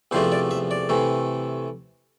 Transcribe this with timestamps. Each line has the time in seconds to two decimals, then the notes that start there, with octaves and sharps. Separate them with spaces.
0.11 E2 C3 F3 A3 D4 C5
0.32 D5
0.51 E5
0.71 D5
0.89 C3 E3 A3